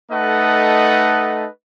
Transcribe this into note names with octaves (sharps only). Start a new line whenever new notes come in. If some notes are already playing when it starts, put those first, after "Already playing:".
A3 D#4 A4 B4 D#5 F#5